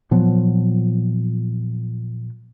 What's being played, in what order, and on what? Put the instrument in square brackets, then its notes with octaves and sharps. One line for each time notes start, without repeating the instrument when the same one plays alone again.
[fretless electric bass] A#2 F3 F#3 B3